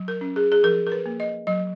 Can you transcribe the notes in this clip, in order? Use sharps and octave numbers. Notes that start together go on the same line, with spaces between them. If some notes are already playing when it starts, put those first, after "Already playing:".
Already playing: F#3
A#4
C#4
G#4
G#4
F3 A#4
A#4
B4
A#3
D#5
F#3 D#5